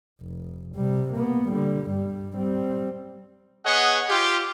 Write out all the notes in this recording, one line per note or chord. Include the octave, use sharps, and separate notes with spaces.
F1
C3 G3
A#3 B3
D3 G3
G2 G3
G3 C4
B3 G#4 C#5 D#5 F#5
F4 G4